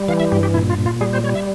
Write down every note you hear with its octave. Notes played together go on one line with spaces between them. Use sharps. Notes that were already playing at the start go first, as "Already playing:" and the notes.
Already playing: G3
E3 F5
E5
G2 G4
G4
A#2 E4
F4
A#2
F4
G3 G#4
C5
G3 C#5
E5